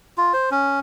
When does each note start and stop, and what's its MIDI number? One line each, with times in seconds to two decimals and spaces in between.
0.18 0.33 65
0.34 0.50 72
0.51 0.80 61